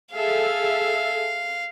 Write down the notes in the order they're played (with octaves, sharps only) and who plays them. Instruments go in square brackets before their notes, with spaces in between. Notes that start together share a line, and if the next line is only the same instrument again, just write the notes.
[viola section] G#4 A4 E5 [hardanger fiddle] F5